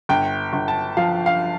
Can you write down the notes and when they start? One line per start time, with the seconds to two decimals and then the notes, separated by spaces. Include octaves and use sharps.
0.09 G1 G5
0.53 G1
0.68 A5
0.97 F3 F5
1.26 F5